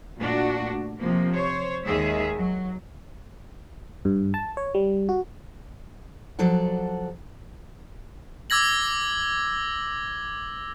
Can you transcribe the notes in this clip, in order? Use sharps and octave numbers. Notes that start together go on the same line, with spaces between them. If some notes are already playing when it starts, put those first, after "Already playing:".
A#2 A3 D4 F#4
C3 F3 A#3
C5 C#5
D#2 D#3 G#3 G#4 E5
F#3
G2
A5
C#5
G3
F#4
F3 F#3 A4 D5 F#5
D6 E6 G#6 A#6 F#7